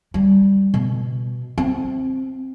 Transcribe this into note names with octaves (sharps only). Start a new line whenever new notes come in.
G3
B2
C4